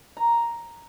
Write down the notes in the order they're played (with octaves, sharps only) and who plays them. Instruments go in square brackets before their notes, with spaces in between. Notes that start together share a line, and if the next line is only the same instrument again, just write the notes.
[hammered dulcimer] A#5